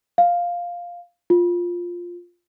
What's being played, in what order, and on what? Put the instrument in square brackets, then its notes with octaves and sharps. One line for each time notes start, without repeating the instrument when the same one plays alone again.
[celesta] F5
F4